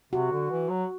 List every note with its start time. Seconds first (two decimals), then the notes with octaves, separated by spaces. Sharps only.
0.13 C3 F#4
0.31 D3
0.50 E3
0.69 F#3